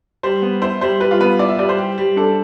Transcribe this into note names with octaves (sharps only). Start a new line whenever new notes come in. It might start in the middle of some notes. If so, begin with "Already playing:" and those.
G3 C5
B3
E4 C5
G3 C5
G3 B4
F4
B3 B4
E4 D5
E5
G3 D5
C5
G4
G3
D4 A4